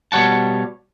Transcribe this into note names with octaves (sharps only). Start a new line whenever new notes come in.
B2 G3 C#5 F#5 A5